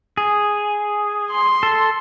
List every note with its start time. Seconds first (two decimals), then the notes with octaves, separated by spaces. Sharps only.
0.17 G#4
1.31 C6
1.63 A4